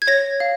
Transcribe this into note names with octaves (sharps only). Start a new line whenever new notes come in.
G#6
C#5 A#6
F5